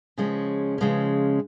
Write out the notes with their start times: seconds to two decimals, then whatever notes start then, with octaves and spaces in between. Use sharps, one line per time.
0.18 C#3 F3 G#3 C#4
0.78 C#3 F3 G#3 C#4